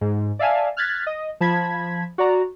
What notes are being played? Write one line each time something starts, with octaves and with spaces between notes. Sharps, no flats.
G#2
D5 E5 F5 G#5 A5
F6 F#6 G#6 A6 B6
D#5
F3 A5 B5 G#6 B6
F#4 D5 A#5